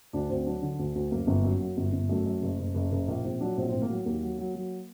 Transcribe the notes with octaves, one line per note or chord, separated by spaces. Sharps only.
D2 D4
D2 C4
F#3 D4
D3
D2
D2
F#2 A#3
G1
F#2
F#3
G1
G1
F#2 A3
F#2
F#1
F#1
F#1
F#1
A#1 A#3
A#1 C4
F#3 D4
A#1 C4
A2 C4
A#3
F#3
D#2 A#3
F#3
F#3
F#3